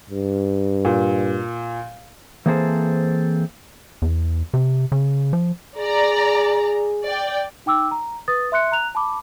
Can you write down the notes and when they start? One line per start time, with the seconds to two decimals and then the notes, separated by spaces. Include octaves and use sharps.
0.10 G2
0.85 A#2
2.46 E3 A#3 C4 G#4 A4 C5
4.02 E2
4.54 C3
4.92 C#3
5.33 F3
5.78 G#4 D5 A#5
7.06 D5 G5
7.66 D#4 G5 D6 E6
7.91 A#5
8.28 B4 D#6 A6
8.52 E5 C6 F#6 C#7
8.72 A#5 F#6 F7
8.95 A5 B5 D6